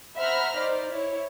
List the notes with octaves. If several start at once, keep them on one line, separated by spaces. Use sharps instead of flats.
C5 E5 F#5 A#5 B5 F6
D#4 C5 D5
E4 C#5